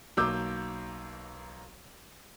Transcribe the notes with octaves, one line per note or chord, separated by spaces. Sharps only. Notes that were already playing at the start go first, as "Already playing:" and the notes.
B1 F#3 A#3 D6 E6 G6